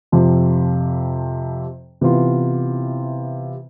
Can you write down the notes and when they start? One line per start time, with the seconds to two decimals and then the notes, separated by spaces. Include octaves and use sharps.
0.12 F2 C3 F3
2.01 C3 E3 B3 F4